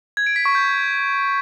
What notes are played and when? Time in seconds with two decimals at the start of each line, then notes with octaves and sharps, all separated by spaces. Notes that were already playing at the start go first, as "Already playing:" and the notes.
0.17 G#6
0.27 D7
0.36 B6
0.45 C#6
0.55 G6